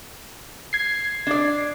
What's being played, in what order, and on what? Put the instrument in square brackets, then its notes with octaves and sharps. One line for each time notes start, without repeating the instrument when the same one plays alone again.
[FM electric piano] G#6 C7
[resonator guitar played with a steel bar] D4 D5